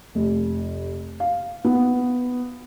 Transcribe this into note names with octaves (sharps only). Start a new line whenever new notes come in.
F1
F5
B3